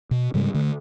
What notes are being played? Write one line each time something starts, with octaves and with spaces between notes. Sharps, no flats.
B2
G#2 C#3 G3 G#3
D3 A3